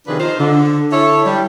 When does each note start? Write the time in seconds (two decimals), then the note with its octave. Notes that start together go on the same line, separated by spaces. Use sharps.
0.07 C3 D#3 F3 D4 G#4 B4
0.20 D#4 F4 C5
0.39 D3
0.92 E4 A4 C#5
1.26 G3